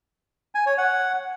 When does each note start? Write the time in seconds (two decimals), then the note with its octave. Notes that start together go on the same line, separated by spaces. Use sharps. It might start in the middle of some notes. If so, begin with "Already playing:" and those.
0.55 G#5
0.66 C#5
0.78 F#5